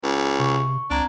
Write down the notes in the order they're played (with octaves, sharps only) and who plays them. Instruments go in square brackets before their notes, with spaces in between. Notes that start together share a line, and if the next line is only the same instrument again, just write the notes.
[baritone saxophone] C#2
[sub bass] C3 [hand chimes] C#6
[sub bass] C#2 [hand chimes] C4 A#5 G#6 [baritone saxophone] D4